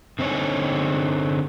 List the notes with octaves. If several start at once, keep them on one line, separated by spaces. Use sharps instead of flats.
D3 C4 D#4 C#5